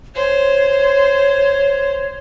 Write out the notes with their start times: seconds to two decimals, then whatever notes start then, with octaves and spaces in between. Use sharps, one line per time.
0.15 C5 C#5